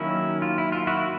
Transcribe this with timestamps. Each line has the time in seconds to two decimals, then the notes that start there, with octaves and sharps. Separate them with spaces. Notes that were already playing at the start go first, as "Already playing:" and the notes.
Already playing: D#3 F#3 A#3 C#4 E4
0.42 F4
0.58 E4
0.72 F4
0.87 E4 F#4